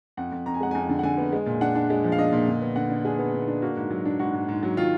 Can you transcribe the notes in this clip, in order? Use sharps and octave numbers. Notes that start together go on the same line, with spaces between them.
F2 F#5
F2
F2 A#5
G#5
G#3 F#5
F2 G#5
D3
F#5
D3 G#5
B3
G#3
A#2
D4 F#5
D4
G#3
F3
F5
D4 D#5
A#2
D3
B3
D3 F#5
D3
D4 G#4
B3
D3
D4
A#3 F#4
G#2
F#3
D4
G#2 F#4
G#2
G#2
F#3
D#3 F4